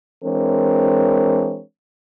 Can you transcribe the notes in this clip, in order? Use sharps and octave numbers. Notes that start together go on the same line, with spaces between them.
E3 G#3 C4 D4 A#4 C#5